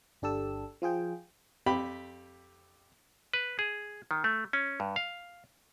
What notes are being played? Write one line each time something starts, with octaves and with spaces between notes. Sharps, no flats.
G1 D4 G4 A4 E6
F3 F4 G#4 G5
F2 G4 B5
B4
G#4
D#3
A3
C#4
G2
F5